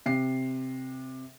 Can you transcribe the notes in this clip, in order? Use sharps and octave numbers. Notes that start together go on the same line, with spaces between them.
C3 C7